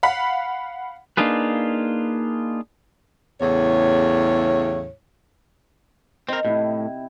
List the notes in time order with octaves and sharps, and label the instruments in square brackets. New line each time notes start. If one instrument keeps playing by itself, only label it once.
[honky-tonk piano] F5 F#5 B5 B6
[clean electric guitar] A#3 D4 D#4 F4 G#4 B4
[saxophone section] E2 A2 C#3 C#5
[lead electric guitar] C4 A#4 [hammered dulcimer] D#5
[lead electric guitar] A2 [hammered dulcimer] C3 E4